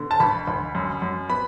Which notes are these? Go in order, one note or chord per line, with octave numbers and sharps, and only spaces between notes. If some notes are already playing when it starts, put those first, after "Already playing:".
Already playing: D3 B3
A5
D2 B5
D2
F#2
F#2
B3 B5